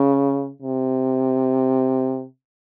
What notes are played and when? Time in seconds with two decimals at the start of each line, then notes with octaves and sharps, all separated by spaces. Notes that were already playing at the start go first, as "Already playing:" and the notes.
Already playing: C#3
0.63 C3